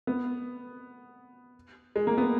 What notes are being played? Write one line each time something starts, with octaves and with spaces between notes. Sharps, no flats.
B3
G#3
A#3
B3